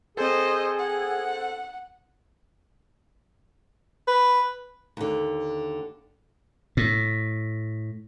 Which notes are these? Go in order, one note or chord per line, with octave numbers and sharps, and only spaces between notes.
C4 G#4 A4 C5 D#5
F#5
B4
D#2 D3
A2